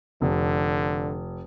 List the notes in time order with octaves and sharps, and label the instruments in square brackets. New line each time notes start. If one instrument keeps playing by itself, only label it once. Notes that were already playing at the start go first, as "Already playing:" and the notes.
[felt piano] F1 [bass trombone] D3